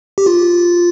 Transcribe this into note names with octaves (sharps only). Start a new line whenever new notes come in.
G4
F4